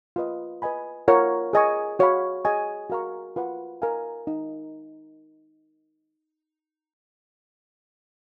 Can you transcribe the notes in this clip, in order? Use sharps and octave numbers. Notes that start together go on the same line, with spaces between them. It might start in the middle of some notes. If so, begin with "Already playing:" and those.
F4 B4 D#5
B4 D#5 G#5 B5
F4 A#4 C#5 F#5
G#4 D#5 G#5 C#6
F#4 C#5 F5 B5
G#4 D#5 G#5 C#6
F#4 A#4 F5 A#5 C#6
F4 B4 F#5
A#4 F5 G#5
D#4